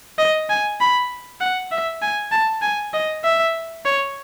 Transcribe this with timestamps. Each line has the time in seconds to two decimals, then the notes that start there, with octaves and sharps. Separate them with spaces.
0.19 D#5
0.50 G#5
0.81 B5
1.41 F#5
1.72 E5
2.02 G#5
2.32 A5
2.62 G#5
2.94 D#5
3.24 E5
3.85 C#5